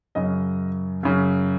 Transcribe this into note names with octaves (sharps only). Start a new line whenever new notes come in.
F#2 C#3 D#5
F#2 C#3